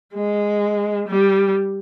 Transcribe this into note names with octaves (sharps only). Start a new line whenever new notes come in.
G#3
G3